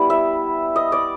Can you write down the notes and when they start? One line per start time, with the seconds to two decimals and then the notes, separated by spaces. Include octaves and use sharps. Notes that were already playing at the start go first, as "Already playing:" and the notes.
Already playing: G3 B3 E4
0.10 E5
0.76 D#5
0.92 D5